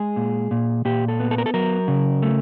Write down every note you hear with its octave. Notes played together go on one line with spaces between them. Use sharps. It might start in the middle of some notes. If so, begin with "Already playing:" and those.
Already playing: G#3 G#4
A#2
A#2
A#2 G4
A4
B3
A4
A#4
A4
F#3 A#4
C#3
A3